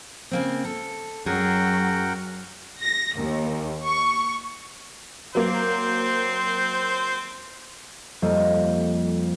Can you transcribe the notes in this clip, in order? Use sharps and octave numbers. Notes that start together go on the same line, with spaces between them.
C#3 A#3 C4
A4
F#2 F#3 G#4 A#4 F#5 G5
A#6
D#2
C#6
F#3 A#3 C4 C5
F2 G3 A#3 A4 D#5 F5